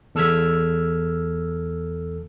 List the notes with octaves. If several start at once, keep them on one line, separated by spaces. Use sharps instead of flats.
E2 A4 E6 F6 G#6 B6